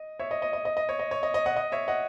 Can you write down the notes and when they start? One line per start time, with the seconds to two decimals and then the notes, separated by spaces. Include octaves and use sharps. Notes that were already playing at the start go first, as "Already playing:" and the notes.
Already playing: D#5
0.19 C#5 E5
0.31 D#5
0.42 D#5
0.53 D#5
0.65 D#5
0.77 D#5
0.89 C#5
0.99 D#5
1.11 C#5
1.23 D#5
1.34 D#5
1.46 D#5 F#5
1.56 D#5
1.72 C#5 E5
1.88 D#5 F#5